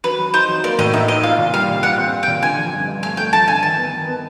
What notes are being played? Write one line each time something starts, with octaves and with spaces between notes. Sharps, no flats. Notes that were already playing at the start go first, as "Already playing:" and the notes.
F#3 B4
F#3
D#4 C5
F#3
A#3 D5
A2 D#5
D#4 E5
D#4 D#5
F4 F5
A#2
G3 F5
A#2
F4 F#5
C4
C4
G5
A#2
D3 G#5
F3
G2
G2
A3 G#5
A3 G5
F3 A5
D3 G#5
D#3 A5
B3
D#3
B3